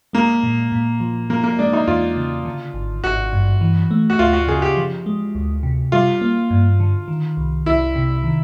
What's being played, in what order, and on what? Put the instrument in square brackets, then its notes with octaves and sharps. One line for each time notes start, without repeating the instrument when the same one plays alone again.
[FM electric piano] G#3 [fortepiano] A#3
[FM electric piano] A#2
A#2
F3
[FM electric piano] F3 [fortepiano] A#3
[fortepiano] A#3
[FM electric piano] G#3 [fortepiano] D4
[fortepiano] D#4
[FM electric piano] E2 [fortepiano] F4
[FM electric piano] C#3
D3
G#1
[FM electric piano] G#1 [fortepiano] F#4
[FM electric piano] G2
E3
A3
[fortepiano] F#4
[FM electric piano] D2 [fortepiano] F4
[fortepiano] F#4
[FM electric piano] C#3 [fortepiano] G#4
[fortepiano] G4
[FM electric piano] F3
G#3
D2
C3
[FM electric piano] G3 [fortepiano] F4
[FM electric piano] A#3
G2
D3
D#3
C2
[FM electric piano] C2 [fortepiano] E4
[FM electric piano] C3
D#3